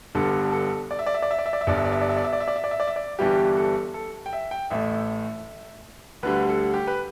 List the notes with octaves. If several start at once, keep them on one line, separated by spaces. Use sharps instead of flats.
G1 G2 D3 G3 A4
A4
D5
E5
D5
E5
D5
E5
D5
E5
D5
E5
G1 G2 G3 D5
E5
D5
E5
D5
E5
D5
E5
D5
E5
D5
E5
D5
E5
D5
E5
D5
G1 G2 E3 G3 G4
A4
A4
G5
E5
G5
A1 A2 A3 E5
D2 D3 G3 B4
A4
G4
B4